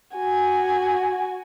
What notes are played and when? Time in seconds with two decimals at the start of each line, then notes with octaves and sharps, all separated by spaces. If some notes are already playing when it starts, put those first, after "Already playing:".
0.16 F#4 G#5